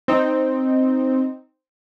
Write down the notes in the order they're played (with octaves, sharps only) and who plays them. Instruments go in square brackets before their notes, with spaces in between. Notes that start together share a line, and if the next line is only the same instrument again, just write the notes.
[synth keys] C4 D#4